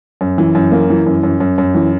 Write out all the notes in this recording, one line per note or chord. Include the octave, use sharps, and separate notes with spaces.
F#2
E3
F#2
A#3
E3
F#2
F#2
F#2
F#2
E3